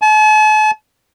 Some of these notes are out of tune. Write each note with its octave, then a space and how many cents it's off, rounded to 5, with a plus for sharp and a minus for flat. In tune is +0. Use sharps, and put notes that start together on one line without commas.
A5 -45